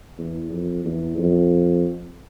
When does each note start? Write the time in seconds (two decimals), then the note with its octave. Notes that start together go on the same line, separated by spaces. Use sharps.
0.18 E2
0.51 F2
0.84 E2
1.18 F2